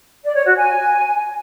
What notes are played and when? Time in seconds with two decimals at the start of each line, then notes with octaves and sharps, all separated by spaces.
0.24 D5
0.35 C#5
0.45 F#4
0.56 G#5